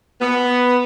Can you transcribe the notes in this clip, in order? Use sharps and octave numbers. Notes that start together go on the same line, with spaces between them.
B3